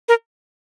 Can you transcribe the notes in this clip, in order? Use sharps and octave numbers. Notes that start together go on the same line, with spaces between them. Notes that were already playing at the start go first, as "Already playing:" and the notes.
A#4